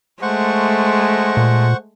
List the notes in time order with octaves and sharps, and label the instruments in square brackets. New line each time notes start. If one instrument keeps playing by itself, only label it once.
[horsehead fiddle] G#3 A3 [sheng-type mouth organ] C5 F#5 C#6
[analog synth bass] A#2